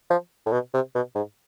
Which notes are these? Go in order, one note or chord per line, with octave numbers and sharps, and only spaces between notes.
F3
A2
B2
C3
B2
G#2